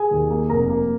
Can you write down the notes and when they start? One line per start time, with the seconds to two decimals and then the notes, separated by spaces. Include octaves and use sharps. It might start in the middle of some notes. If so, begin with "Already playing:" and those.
Already playing: G#4 G#5
0.11 D#2
0.30 A#3
0.50 F1 A#4 A#5
0.70 A#3